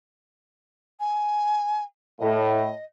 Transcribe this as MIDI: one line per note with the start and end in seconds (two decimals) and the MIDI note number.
1.00 1.84 80
2.19 2.69 45
2.19 2.84 75